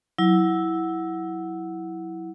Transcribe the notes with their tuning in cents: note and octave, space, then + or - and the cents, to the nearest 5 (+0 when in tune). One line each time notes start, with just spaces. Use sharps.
F#3 -5 E4 -10